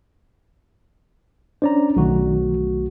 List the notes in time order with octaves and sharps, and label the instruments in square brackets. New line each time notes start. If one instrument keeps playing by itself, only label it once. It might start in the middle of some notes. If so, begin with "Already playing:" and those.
[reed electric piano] C#4 D4 [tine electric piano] C5 D5 A#5
[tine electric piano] B1 A3 F#4 [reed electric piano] D#3 F#3